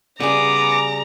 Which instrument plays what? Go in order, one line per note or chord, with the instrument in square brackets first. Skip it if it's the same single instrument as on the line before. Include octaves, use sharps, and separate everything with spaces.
[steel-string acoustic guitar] C#3 G3 G#4 [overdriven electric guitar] B3 [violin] A#5 [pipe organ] D6